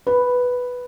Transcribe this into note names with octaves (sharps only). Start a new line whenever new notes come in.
B4